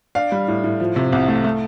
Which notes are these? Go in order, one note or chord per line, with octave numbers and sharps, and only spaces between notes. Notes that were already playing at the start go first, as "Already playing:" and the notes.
D4 F5
G3
A2
A2
F3
C3
C2
A3
A3